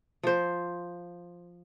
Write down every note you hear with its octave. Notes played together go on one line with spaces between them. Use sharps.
F3 C5